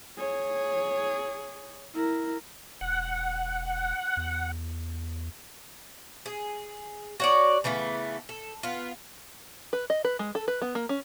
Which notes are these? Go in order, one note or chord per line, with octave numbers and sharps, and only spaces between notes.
G#4 C#5
E4 A#4
E1 F#5
E2
G#4
F#4 C#5 D5
C#3 E3 A3 B3
A4
B3 F4
B4
D#5
B4
G#3
A4
B4
B3
A#3
C#4